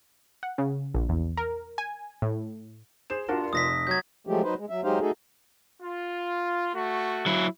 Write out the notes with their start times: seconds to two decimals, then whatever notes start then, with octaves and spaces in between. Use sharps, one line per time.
0.43 F#5
0.58 C#3
0.95 A#1
1.09 E2
1.37 A#4
1.78 G#5
2.22 A2
3.10 G#4 C5 E7
3.29 G2 A#2 D4 F4 F#4 A#4
3.53 F1 D#6 A#6 B6
3.87 F#3 G6 G#6
4.27 F3 F#3 G#3 A3 G4
4.44 F#3 D#4 B4 C5
4.58 G#3
4.70 F#3 E5
4.84 F#3 G#3 D#4 G4 C5 F5
5.01 A3 D#4 F#4 G#4 A4
5.81 F4
6.74 A3 F#4
7.26 F#3 E4